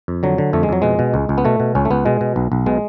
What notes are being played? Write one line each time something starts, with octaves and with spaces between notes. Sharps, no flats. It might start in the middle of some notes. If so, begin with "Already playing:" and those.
F2
D3 F#3
D3
F2 A3
G#3
F2 F#3
B2 G#3
B2
C#2
C#2
B3
B2 A3
B2
C#2 C#4
A3
C#2 B3
B2 G#3
B2
B1
B1
B2 G#3